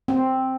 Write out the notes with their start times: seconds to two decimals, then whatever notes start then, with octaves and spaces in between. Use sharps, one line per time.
0.08 C4